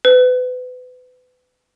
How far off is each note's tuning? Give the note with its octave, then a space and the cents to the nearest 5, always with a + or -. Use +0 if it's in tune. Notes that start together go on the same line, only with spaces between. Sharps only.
B4 +30